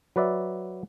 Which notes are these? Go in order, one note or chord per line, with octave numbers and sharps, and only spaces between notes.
F#3 B4 D5 E5